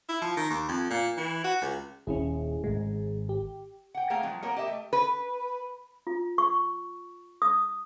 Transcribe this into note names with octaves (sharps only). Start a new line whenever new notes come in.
E4
F3
D#3
D#2
F2
A#2
E3
F#4
C#2
D#1 D#2 C#4 E4 G#4
G#1 G#2 G#3
G4
F#5 G5
A3 A#3 G#4 F5 G5
F3 F#3 G#3
A#3 B3 A#4 C#5 G5
G4 D#5 E5
A3
B4
F4
C#6
D#6